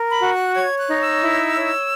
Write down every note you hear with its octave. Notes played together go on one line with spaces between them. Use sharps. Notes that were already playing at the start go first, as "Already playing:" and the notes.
Already playing: A#4
B5
F#4
F#6
C#5 G#6
F#6
D#4
E6
E4
C#5